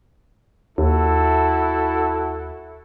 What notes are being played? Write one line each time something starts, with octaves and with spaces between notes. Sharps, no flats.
D#2 E4 F#4 A4